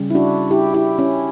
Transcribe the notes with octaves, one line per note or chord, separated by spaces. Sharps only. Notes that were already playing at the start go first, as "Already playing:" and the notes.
Already playing: C#3 G3
E4
D4 F#4
E4 G4
E4 G4
C#4 E4